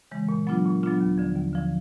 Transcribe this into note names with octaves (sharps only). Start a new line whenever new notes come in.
C#3 E3 G#3
A#2
F#3 B3 D4 F4
A#2
F#3 B3 D4 F4
D#2
D3 F3
D#2
D3 F3